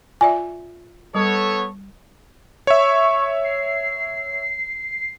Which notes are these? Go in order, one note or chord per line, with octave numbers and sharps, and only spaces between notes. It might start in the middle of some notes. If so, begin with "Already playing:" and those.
F4 D5 E5 G#5
G3 B3 A4 C#5
C#5 E5 C#6
C7